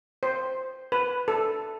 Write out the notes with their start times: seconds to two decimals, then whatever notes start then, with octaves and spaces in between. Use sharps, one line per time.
0.23 C5
0.92 B4
1.28 A4